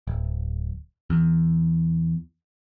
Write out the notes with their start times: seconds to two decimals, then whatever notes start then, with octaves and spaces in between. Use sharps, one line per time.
0.07 D1
1.10 E2